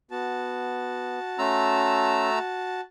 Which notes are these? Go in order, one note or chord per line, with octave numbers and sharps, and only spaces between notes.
B3 F#4 A5
A3 C#4 A#5 C6 E6